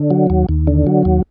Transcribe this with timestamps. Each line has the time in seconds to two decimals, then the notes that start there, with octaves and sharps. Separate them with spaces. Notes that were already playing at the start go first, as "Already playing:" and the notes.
Already playing: D3
0.11 F#3
0.30 D#2
0.49 D#2
0.67 D3
0.87 F#3
1.05 D#2